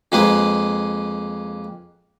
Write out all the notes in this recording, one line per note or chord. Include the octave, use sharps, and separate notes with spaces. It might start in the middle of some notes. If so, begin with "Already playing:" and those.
F2 G#3 A#3 B4